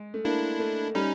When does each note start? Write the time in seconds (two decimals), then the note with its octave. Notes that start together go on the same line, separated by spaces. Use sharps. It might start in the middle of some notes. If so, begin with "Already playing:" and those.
Already playing: G#3
0.14 A3
0.24 A#3 D4 E4
0.60 A3
0.95 G3 C#4 D#4